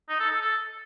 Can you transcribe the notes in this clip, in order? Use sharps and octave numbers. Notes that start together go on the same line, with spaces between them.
D#4
A4
A4
A4